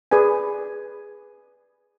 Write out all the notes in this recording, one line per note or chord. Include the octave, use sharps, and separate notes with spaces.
G#4 B4 D5 G#5